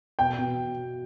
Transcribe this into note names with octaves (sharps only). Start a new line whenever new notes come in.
B2 G5
B2